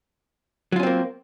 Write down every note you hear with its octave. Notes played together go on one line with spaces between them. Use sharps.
F#3 A#3 C4 C#4 F4